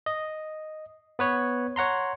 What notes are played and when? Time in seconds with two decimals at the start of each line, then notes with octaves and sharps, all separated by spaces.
0.06 D#5
1.19 B3 B4 C#5
1.76 C#5 F#5 A#5 C6